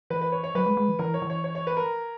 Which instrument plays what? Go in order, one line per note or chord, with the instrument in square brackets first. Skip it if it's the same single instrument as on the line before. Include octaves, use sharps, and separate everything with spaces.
[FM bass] E3 [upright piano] B4
[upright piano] B4
C#5
C#5
[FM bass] F#3 [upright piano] B4
[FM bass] G#3
G#3
E3
[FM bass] E3 [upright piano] A#4
[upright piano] C#5
[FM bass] E3
[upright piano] C#5
C#5
C#5
B4
A#4